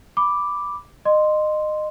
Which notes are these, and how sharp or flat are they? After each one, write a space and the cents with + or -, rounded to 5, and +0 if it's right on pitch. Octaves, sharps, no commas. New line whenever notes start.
B5 +0 D6 +0
D#5 -25 C6 -5